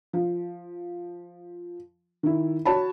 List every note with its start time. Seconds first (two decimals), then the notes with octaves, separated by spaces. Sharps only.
0.13 F3
2.23 D#3 E4
2.65 F#4 C#5 A5 B5